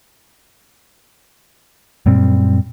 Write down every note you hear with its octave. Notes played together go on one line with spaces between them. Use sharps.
F#2 A#2 G3 C4